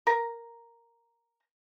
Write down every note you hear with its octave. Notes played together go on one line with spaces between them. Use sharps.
A#4 A#5